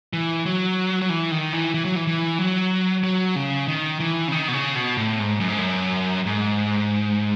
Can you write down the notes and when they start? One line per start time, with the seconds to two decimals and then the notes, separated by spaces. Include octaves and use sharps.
0.13 E3
0.45 F#3
1.02 F#3
1.10 E3
1.31 D#3
1.53 E3
1.74 E3
1.85 F#3
1.96 E3
2.07 E3
2.38 F#3
3.04 F#3
3.36 C#3
3.68 D#3
4.00 E3
4.28 C#3
4.32 D#3
4.48 B2
4.54 C#3
4.76 B2
4.97 A2
5.19 G#2
5.40 F#2
5.49 G#2
5.58 F#2
6.26 G#2